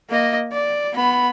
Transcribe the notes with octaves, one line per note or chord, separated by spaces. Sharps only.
A#3 D#5
D5
B3 B5